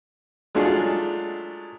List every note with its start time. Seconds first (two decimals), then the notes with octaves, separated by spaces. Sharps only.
0.55 F#3 G#3 A3 D4 F4 G#4